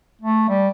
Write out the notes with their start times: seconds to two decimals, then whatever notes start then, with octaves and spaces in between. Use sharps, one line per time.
0.21 A3
0.49 G3